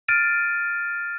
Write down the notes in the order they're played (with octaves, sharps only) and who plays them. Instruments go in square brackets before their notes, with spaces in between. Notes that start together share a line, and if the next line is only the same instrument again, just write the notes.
[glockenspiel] F6 A6 D7 D#7